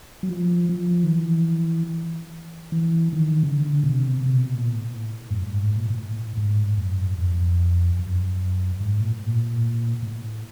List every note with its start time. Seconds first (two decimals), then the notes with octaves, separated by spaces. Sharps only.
0.23 F#3
0.29 F3
0.69 F3
1.04 D#3
1.10 E3
2.72 E3
3.13 D#3
3.43 C#3
3.53 D3
3.84 B2
3.94 C3
4.26 C3
4.35 B2
4.55 A#2
4.75 A2
5.30 F#2
5.43 G2
5.56 G#2
5.76 A#2
5.90 A#2
5.96 A2
6.37 G#2
6.78 F#2
7.18 F2
7.99 F#2
8.80 G#2
9.01 A#2
9.13 A2
9.26 A#2
10.02 A2